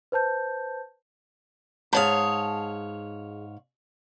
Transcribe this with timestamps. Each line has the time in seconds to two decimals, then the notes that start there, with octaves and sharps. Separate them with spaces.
0.12 B4 C5 A5 G6
1.93 G#2 G#4 C#5 F5 A5